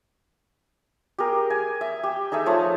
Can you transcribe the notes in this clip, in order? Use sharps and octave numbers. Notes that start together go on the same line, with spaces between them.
G4 G#4 A#4
G#5
E5
G4
D#4 G#4 A4 E5
F3 A3 C#5